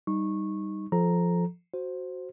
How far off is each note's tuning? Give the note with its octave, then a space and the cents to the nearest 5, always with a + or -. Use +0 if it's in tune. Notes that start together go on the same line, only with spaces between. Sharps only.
G3 +0 D#4 +0 C#6 -15
F3 +0 A4 -20 A#5 +0
F#4 +0 C5 +0